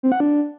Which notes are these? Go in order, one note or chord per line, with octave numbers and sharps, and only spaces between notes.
C4
F#5
D4